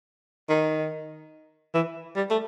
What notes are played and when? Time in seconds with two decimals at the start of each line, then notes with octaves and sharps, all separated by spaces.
0.49 D#3
1.74 E3
2.16 G3
2.30 A3